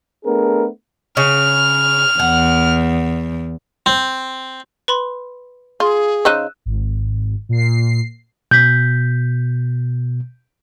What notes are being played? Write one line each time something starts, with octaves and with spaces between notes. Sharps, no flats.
A3 B3 D4 G#4 A#4
C#3 F6
E2 F#5
C4
B4 B5 C6
F4 G#4
C#3 D#4 C5 E6 F#6 D#7
G#1
A#2 C7
B2 G6 B6